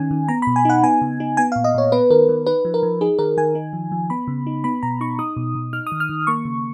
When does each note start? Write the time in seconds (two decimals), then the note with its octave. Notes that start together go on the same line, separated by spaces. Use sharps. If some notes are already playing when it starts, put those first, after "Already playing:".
Already playing: D#3 C#4 D#4 G#5
0.11 D#3
0.28 B3 A#5
0.42 B5
0.47 B2
0.56 G#5
0.65 D#4 F#5
0.83 B3 G#5
1.02 C#3
1.20 D#4
1.37 B3 G#5
1.52 A#2 F5
1.64 D#5
1.74 A#2 C#5
1.92 B3 B4
2.10 D#3 A#4
2.29 D#3
2.46 D#4 B4
2.65 F3
2.74 A#4
2.83 F3
3.01 D#4 G#4
3.19 D#3 A#4
3.37 D#3 G#5
3.55 D#4
3.73 F3
3.92 F3
4.10 B3 B5
4.28 C#3
4.47 D#4
4.64 B3 B5
4.83 B2 A#5
5.01 D#4 C#6
5.19 D#4 D#6
5.37 B2
5.55 B2
5.73 D#4 F6
5.87 D#6
5.92 D#3
6.00 F6
6.09 D#3
6.27 A#3 C#6
6.45 C#3